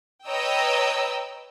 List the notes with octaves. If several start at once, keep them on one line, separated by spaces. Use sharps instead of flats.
B4 C#5 D#5 G5 A#5 E6